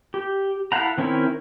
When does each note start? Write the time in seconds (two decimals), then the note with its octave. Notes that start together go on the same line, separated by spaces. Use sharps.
0.14 G4
0.72 E4 A4 F5 F#5 A#5
0.98 D#3 C4 C#4 E4 A#4